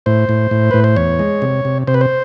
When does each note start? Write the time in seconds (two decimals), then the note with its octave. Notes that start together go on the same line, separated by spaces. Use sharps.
0.06 A2 C5
0.29 A2
0.51 A2
0.71 A2 B4
0.84 C5
0.96 E2 C#5
1.19 G#3
1.42 C3
1.65 C3
1.87 C3 C5
1.94 B4
2.01 C5